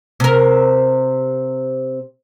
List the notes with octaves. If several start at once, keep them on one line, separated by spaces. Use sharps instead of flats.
C3 A#4